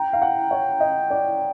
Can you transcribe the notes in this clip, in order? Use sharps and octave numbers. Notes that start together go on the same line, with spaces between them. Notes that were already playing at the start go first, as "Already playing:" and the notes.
Already playing: G5 A#5
F5
F#5
C#5
D#5
D5